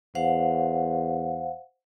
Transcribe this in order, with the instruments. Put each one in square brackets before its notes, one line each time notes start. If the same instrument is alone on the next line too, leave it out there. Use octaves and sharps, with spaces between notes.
[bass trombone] E2 [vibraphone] C5 F5 F#5